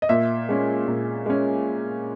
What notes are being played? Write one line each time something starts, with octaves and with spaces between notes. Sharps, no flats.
D#5
A#2 E5
G#3 C#4
A#2
G#3 C#4